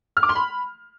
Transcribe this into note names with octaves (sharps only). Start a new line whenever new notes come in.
F6
D6
C6
B5